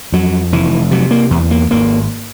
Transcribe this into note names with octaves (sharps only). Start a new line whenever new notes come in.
F2 F#3
F1 E3
C3 F#3
A#3
E2
A#3
G#1 A#3